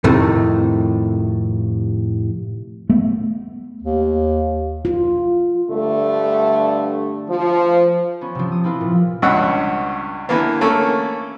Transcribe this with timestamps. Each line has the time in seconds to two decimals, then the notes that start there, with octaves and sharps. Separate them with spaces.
0.04 F2 A2 C3 D#3 A3
2.90 A3 B3
3.82 D#2
4.85 F4
5.70 G2 D3 A3
7.29 F3
8.21 B3 C#4
8.35 C3 F3
8.52 D#6
8.64 C4 E4 F4 B4
8.81 A#2
9.22 C#2 G2 B2 C#4 F#5 E6
10.29 D3 E3 A#3 B3
10.61 A3 A#3 C#4 A4